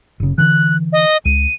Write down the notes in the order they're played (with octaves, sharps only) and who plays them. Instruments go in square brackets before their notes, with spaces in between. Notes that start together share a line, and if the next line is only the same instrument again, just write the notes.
[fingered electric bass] F#1 C#3
[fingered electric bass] D3 E3 [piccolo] F#6
[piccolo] D#5
[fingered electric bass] C#2 [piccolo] D#7